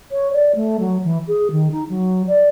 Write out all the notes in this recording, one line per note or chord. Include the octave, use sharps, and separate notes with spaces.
C#5
D5
A3
F#3
E3
G#4
D#3
D#4
F#3
D5